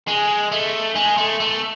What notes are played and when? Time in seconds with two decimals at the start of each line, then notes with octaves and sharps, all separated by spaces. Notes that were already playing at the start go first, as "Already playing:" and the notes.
0.07 G#3
0.52 A3
0.95 G#3
1.17 A3
1.40 A3